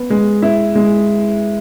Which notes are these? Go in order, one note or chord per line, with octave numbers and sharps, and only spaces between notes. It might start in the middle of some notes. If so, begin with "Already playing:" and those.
Already playing: B3
G#3
E4
G#3